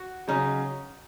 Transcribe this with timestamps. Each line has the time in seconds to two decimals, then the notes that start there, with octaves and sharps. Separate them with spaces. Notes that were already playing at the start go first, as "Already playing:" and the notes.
Already playing: F#4
0.28 C#3 F#3 C#4 D#4